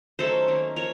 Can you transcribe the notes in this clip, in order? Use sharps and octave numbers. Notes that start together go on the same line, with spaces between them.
D#3 F#3 A3 C#4 A4 C5
D#3 A#3 C#4
F3 A#4 C#5